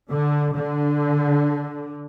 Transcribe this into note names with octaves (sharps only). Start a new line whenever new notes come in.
D3
D3